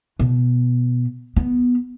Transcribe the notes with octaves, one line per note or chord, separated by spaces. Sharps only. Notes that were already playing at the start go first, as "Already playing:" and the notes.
B2
B3